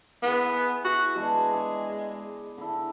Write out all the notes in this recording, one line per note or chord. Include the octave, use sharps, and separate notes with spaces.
B3 E4 G#4
E4 F#4
G#3 B3 D4 G#4
G#4
D3 E4